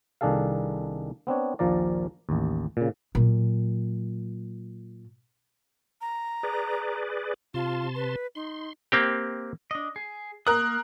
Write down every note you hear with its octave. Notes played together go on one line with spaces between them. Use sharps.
C2 D#3 D4 G#4 A4 F5
B3 C4 D4 C#5
A#1 D#2 A#2 F3 A#4 D5
A1 D#2
A#2 C#3
A#2 F#3
A#5
G#4 B4 D5
C3 F4 A5 C6
B4
D#4 C6
A#3 C4 G4
D4 D#5
G#4
A#3 A#4 D#6 F#6